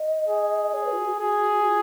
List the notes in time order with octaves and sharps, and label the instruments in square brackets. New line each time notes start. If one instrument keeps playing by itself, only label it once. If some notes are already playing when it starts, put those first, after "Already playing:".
Already playing: [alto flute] D#5
[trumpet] G#4
[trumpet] G#4 [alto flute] C#5
[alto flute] B4
F4
F#4
F#4
[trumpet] G#4
[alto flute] F4